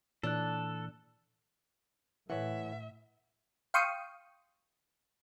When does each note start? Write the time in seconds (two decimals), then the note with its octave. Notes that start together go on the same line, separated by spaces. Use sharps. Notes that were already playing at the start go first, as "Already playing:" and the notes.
0.23 A#2 E3 D4 A4 F#6
2.30 A2 E3 B4 C#5 E5 F#5
3.74 F5 G5 C6 C#6 D#6